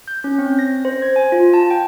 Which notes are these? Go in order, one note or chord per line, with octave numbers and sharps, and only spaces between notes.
G6
C#4
C4
A#6
C5
G#6
G#5
F4
A5
G5